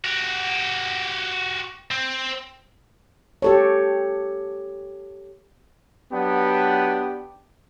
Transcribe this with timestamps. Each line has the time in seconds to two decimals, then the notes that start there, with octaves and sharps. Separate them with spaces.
0.05 F#4 G4
1.91 C4
3.42 G4 A4 C#5
6.12 F#3 B3 D4 G4